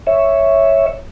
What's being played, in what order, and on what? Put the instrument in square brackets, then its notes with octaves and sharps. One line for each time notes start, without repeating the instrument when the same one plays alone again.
[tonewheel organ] C#5 E5